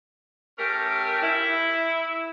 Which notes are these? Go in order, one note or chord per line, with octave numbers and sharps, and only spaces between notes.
A3 C#4 G4 A#4
E4